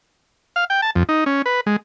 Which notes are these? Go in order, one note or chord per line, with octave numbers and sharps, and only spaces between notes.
F5
G5
A5
F2
D#4
C#4
B4
G#3